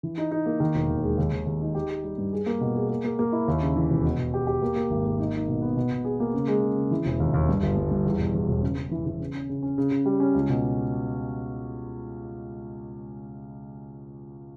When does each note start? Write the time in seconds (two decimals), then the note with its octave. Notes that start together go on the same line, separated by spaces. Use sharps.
0.03 E3
0.18 D#4
0.31 D#4
0.46 A#3
0.60 D#3
0.75 E1
0.89 D#2
1.03 G#3
1.18 D#2
1.33 D#2
1.47 D#2
1.62 D#4
1.75 G4
1.90 G4
2.04 G3
2.18 G2
2.33 G#4
2.46 A#3
2.61 B2
2.76 G#4
2.89 A#3
3.04 A#3
3.19 A#3
3.32 E4
3.48 D#2
3.62 C#3
3.76 E3
3.90 E1
4.05 B2
4.18 B2
4.34 G4
4.47 G4
4.62 A#3
4.76 A#3
4.90 G#1
5.05 A#3
5.19 D#4
5.34 D#4
5.48 B2
5.62 B3
5.76 B2
5.91 B2
6.05 G#4
6.20 A#3
6.34 C#3
6.47 G#3
6.63 C#3
6.77 C#3
6.91 E3
7.06 E1
7.20 D#2
7.34 D#2
7.49 G2
7.63 G1
7.77 G2
7.91 G2
8.06 E2
8.19 B2
8.34 E2
8.48 E1
8.62 C#3
8.78 C#3
8.91 E3
9.06 E3
9.20 C#3
9.34 C#4
9.49 C#3
9.63 C#4
9.78 C#3
9.91 C#3
10.06 G3
10.20 C#4
10.35 C#2
10.49 B2